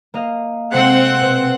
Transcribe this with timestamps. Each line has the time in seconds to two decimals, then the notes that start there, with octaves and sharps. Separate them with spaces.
0.14 A#3 D#5 F5
0.73 C3 G#3 C4 A4 F#5
1.21 B2